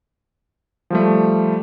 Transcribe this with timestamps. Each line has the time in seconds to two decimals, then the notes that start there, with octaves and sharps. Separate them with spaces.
0.90 F3 G3 A3